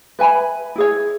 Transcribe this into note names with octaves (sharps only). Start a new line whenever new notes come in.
B4 E5 G#5 B5
E4 G#4 C#5